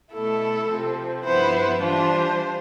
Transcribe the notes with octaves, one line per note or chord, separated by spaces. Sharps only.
B2 A3 E4 A4
C3 F3 C4
G2 F3 B3 E4 C5
E3 G3 D4 F4 C5